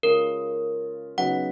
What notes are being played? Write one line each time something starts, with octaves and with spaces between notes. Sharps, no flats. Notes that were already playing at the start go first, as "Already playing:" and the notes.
C#3 G#3 C#4 F4 A#4
C#3 F#3 B3 D#4 F#5